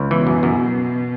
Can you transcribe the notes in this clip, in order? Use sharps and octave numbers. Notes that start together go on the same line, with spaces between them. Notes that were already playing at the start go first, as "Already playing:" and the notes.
Already playing: C#2
B2 E3
F#2
F#2